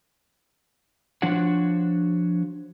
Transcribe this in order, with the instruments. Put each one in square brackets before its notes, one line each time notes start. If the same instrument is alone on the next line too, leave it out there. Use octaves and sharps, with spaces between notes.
[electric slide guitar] F3 D4 F#4 C5 C#5 F#5